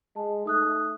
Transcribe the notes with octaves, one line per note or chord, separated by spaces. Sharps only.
G#3 A5
A3 D#4 D#6 F#6